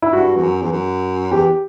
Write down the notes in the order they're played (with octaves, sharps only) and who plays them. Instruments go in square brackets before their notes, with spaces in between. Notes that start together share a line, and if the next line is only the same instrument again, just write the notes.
[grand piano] E4
[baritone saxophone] G2 [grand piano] F#4
[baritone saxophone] E2
F#2
E2
F#2
[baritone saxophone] E2 [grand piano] G4